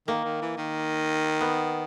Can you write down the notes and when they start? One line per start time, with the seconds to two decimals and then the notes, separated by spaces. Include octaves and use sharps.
0.08 D#3 A#3
0.24 D#3
0.42 E3
0.58 D#3
1.41 B3